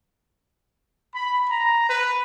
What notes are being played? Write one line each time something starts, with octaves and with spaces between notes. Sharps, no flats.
B5
A#5
B4